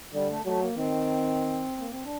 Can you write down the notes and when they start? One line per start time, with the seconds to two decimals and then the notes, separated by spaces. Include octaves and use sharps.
0.13 D3 G3
0.29 A3
0.45 F#3 A3
0.61 A#3
0.77 D#3 C4
1.78 A#3
1.91 C4
2.04 D4